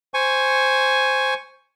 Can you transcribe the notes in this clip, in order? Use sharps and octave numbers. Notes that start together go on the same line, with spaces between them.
C5 G#5 C#6